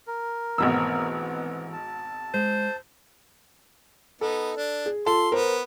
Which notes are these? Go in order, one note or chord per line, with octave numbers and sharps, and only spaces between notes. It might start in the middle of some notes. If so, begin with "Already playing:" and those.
A#4
G#1 B2 E3 A3 B3 C4 E6
A5
G#3 C5
B3 D#4 A4
D4
G#4
F4 A4 A5 C6
B3 A#4 C5